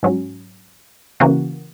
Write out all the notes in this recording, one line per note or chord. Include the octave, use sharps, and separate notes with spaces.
G#2 F#3 C#4
C#3 E3 A#3 C#4 F#4